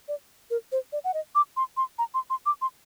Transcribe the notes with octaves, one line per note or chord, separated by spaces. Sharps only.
D5
A#4
C5
D5
F#5
D#5
D6
C6
C6
A#5
C6
C6
D6
C6